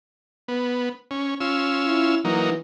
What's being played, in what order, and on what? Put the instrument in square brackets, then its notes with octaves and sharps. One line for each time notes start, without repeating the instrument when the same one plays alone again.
[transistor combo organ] B3
C#4
C#4 F4 E6
[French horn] E4
[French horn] E3 [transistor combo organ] F#3 A#3 D#4